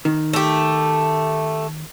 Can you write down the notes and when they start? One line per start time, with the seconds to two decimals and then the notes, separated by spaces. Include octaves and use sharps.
0.05 D#3
0.33 A3 G4